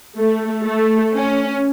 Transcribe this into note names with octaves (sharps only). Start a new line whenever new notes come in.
A3
A3
C#4